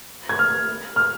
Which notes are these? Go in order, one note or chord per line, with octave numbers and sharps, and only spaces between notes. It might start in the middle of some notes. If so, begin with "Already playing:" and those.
G#6
F6
F6